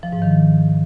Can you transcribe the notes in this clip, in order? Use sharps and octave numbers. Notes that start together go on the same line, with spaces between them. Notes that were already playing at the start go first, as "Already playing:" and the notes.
F3
G#2
D#3